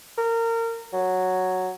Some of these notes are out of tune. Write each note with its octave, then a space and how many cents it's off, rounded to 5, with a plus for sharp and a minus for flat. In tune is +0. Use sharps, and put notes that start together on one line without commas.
A#4 -25
F#3 +0